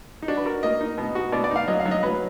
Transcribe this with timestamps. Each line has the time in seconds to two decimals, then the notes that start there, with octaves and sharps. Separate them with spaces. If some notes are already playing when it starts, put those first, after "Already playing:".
0.22 D#4
0.28 D4 F#4
0.37 B4
0.45 F#4 A#4
0.63 A#3 D#5
0.81 D#4
0.98 B2
1.15 F#4
1.32 B2 D5
1.44 D5
1.51 D#4 F5
1.68 F#3 D#5
1.80 F5
1.85 F#3
1.91 D#5
2.03 F#3 B4